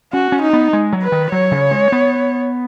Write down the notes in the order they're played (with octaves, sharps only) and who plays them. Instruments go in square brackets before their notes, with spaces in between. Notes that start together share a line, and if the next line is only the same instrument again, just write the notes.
[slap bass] C#4 [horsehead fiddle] F#4
[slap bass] C#4
[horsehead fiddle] D#4
[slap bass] B3
G#3
F#3
[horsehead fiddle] B4
[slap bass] D#3
[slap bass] F#3 [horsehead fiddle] C#5
[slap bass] C#3
G#3
B3